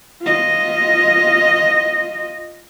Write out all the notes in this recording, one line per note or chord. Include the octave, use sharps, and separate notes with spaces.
F4 D#5